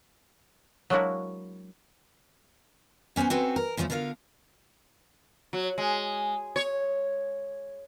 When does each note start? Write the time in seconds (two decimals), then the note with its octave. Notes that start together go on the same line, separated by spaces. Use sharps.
0.90 F#3 G#3 A#3 D4 E4 F#4
3.16 B3 C#4 C5 F#5 G#5
3.30 C4 C#4 F#4 A4 B4 C5
3.56 A#4
3.77 E2 C#3 F3 G#3 A3
3.90 D3 F4 A#4 C5 F5
5.53 F#3
5.78 G#3
6.56 C#5